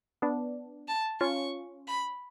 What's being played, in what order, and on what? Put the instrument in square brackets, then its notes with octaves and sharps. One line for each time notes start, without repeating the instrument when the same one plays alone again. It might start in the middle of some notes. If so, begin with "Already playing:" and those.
[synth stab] B3 D4
[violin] A5
[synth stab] C#4 F4 [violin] C#6
[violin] B5